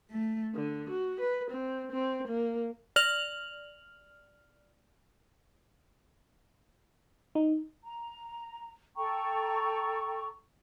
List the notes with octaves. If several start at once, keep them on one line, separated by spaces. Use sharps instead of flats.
A3
D3
F#4
B4
C4
C4
A#3
D5 F6 F7 F#7
D#4
A#5
A4 G5 A#5 C#6